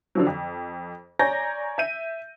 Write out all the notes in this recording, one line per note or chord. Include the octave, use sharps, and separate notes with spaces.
D3 F3 F#3
F2
C#5 D5 G#5 A#5 G6 A#6
E5 G6 D#7